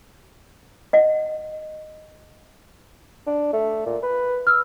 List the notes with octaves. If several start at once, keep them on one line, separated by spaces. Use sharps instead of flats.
D#5 F#5
D4
A3
A#2
B4
E6 F6